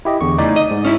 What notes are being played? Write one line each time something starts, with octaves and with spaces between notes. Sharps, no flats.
E4 G4 D#5
E2 D3 C#6
A2 C#3 D#4 D5
D#5
G#2
C#4 E4